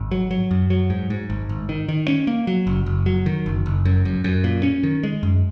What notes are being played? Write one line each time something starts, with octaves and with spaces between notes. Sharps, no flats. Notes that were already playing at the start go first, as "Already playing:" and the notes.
Already playing: G#1
F#3
F#3
F#2
F#3
G#2
G#2
G#1
G#1
D#3
D#3
C#4
A#3
F#3
F#1
F#1
F#3
D#3
F#1
F#1
F#2
F#2
F#2
A#2
C#4
D#3
G#3
F#2